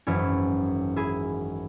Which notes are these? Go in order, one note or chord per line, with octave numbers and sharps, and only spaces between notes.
G#1 F#2 E3 C#4 E4
E4 G#4